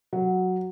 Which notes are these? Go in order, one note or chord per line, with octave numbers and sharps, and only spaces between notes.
F#3